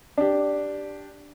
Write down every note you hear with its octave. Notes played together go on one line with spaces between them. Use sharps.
D4 G4